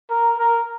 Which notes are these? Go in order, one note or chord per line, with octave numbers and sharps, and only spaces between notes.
A#4
A#4